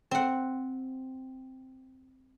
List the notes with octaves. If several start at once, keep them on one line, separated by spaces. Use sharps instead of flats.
C4 F#5